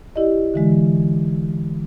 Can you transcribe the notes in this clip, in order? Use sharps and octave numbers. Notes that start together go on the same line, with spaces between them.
E4 G4 D5 D#5
D3 E3 G#3